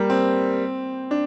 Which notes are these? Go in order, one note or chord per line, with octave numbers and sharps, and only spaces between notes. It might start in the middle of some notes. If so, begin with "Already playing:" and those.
Already playing: G3 A#3
C4
D4